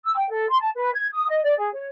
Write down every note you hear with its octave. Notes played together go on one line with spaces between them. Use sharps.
E6
G5
A4
C6
A5
B4
G#6
D#6
D#5
D5
G#4
C#5